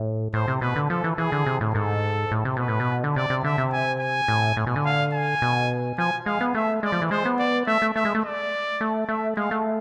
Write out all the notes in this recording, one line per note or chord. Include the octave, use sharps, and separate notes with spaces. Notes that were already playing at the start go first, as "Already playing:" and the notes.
Already playing: A2
A2 C5
C3
B2 B4
D3
F3 A4
E3
E3 G#4
D3
C3
A2
G#2 A4
A2
C3
B2 B4
A2
B2
D3
C3 D5
C3
D3 E5
C3
G#5
G#5
A2
A2
B2
D3
F5
G#5
B2
F3 G#5
G#3 F5
B3
A3 E5
G#3 D5
F3
E3
G#3 C5
B3
D5
A3 E5
A3
A3 E5
G#3
A3
D5
A3
A3 E5
G#3 F5
A3